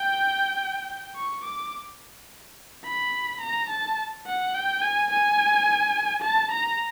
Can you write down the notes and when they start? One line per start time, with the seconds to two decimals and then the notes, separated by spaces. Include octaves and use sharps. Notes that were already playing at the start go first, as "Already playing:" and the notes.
Already playing: G5
1.16 C#6
1.45 D6
2.85 B5
3.41 A#5
3.70 A5
4.27 F#5
4.55 G5
4.82 G#5
5.11 G#5
6.23 A5
6.52 A#5